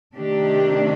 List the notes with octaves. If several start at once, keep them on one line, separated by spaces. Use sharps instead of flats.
C3 D#3 A3 D4 G4